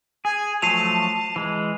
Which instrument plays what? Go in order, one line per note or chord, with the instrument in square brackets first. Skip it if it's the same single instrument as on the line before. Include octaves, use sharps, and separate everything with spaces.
[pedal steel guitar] G#4 [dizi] G#5
[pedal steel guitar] F3 F#3 A3 [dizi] A5 [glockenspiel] C7 D#7 F7
[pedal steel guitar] E3 G#3